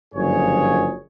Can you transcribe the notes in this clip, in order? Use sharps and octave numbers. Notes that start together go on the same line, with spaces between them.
F#1 G2 D3 F3 G#4 C#5